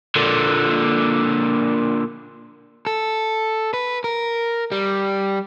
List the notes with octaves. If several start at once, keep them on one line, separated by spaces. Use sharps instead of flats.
A#2 D3
A4
B4
A#4
G3